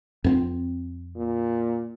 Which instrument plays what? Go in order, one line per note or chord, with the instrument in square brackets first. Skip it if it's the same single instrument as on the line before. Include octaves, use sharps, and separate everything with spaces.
[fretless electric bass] F2 B3 C4
[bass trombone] A#2